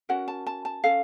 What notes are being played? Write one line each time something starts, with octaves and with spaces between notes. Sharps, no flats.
C#4 F#4 A#4 F#5
A5
A5
A5
C#4 A4 F5